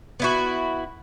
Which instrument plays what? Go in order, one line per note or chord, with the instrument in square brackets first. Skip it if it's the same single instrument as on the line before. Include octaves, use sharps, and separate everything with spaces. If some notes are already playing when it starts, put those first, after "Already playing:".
[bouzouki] B3 E4 F#4